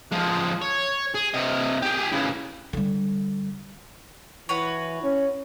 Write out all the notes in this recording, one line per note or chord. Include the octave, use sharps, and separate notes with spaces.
F3 G#3
C#5
G#4
C3 D#5
G4 G#4
C#3 E3
D3 G3
E3 F#4 B4 C#5
C#4